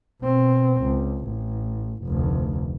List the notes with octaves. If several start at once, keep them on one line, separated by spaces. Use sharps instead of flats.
B2 C4
C#2
A1
F1 D2